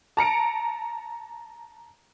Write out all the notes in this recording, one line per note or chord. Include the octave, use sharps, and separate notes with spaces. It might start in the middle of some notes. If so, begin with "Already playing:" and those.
A5 A#5 C#7 D7